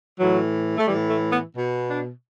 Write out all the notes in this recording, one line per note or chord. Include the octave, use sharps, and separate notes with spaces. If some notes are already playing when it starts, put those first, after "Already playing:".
A2 E3 F#3
A3
A2 E3 G3
A3
B3
B2
D4